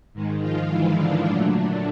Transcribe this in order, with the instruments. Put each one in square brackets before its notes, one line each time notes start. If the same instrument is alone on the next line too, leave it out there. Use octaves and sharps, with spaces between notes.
[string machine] G#2 D#3 G#3
F3 F4
E3 E4
D3 D4
A#2 F#3 A3